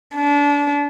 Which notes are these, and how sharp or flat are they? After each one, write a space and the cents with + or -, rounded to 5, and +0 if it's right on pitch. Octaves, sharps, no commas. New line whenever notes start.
D4 -30